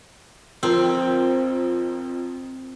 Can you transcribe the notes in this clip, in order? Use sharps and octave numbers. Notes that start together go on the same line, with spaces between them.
F2 F3 C4 A#4